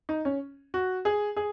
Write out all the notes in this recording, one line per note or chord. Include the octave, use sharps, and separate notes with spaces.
D#4
C#4
F#4
G#4
G#4